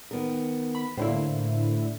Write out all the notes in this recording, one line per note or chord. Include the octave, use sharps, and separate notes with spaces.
D#3 B3 A#4
B5
A2 D3 A#3 E4 C5